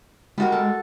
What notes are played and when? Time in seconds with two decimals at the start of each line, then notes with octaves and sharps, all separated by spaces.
0.38 G3 G#3 F#4 A#4
0.52 A4